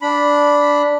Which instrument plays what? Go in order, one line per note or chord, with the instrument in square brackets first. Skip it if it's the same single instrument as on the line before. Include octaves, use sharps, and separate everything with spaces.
[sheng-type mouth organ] D4 B5